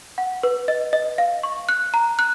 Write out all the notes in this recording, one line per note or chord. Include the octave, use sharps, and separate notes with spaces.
F#5
B4
D#5
D#5
F5
C#6
F#6
A#5
F#6